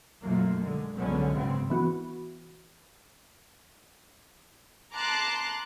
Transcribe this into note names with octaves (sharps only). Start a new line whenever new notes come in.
F#2 B2 F3 F#3 A3 A#3
D3 G#3
C2 D3 F#3 G#3 B3 C#4
G#1 C#3 B3 C4
E3 B3 F#4
A5 A#5 C6 D6 F#6 A6